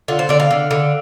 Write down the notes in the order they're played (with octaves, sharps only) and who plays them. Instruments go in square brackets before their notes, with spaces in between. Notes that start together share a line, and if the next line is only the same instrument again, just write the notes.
[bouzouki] D3 F4
C5
D3 D5
F5
D3
D3